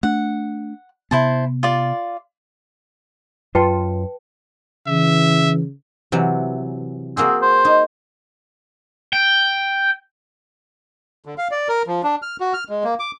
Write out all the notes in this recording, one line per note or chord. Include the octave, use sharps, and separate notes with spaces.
A3 D4 F#5
C3 B3 E4 C5 A5
F4 D5
F#2 F4 B4 G5 A5 C6
C#3 E3 E5
C3 E3 F#3
A#3 C4 F#4 G#4
C5
D#4
G5
D3
F5
D5
A#4
F3
D4
F6
F#4
F6
G#3
A#3
D6